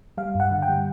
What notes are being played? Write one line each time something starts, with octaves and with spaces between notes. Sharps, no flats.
G3 F5
G2 F#5
D3
G5
G3